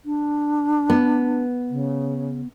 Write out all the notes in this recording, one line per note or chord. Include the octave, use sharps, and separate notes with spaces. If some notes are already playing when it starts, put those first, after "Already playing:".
D4
B3
C#3